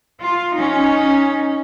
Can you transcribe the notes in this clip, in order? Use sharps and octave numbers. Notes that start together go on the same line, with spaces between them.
F4
C#4 D#4